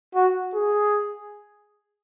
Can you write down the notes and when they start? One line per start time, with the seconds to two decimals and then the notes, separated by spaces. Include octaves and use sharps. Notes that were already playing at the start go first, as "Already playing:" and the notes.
0.15 F#4
0.55 G#4